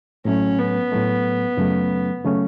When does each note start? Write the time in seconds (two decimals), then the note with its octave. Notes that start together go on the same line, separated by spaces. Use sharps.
0.25 A2 F#3 A3 C#4
0.59 B3
0.92 A2 F#3 A3
1.57 F#2 C#3 F#3 A3 C#4
2.24 C#3 F#3 A3 C#4